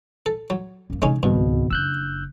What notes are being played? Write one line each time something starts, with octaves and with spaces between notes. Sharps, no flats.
A4
F#3
F#2 A#3
C3 E3 G#3 C#4 D#4
G#1 C#2 G2 B2
F#1 D4 E6 F#6 G6